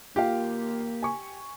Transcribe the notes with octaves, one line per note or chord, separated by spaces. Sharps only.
A#3 F4 G4 F5
G#5 C#6